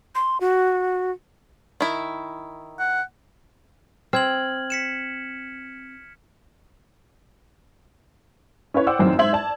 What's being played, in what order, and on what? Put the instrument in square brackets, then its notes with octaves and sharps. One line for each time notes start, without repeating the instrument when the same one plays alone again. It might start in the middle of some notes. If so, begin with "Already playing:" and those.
[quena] C6
F#4
[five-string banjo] D#3 E4
[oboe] F#5
[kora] C4 [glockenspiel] F6 G#6 F#7
[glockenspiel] B6 C#7 E7
[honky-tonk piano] C#4 E4 B4 C#5
C5 D5 F#5 G5 D6 E6
A1 F#2 D#3 C4
G#2 C5 E5 C6 G#6 F#7
D5 A5